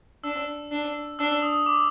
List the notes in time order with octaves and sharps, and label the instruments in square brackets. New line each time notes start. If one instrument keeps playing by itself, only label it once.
[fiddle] D4 [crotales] E6
[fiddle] D4
[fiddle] D4 [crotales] E6
[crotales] D#6
D6